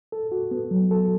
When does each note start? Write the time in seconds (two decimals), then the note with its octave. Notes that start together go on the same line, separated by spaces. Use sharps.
0.12 A4
0.32 F#4
0.51 B3
0.71 F#3
0.91 A4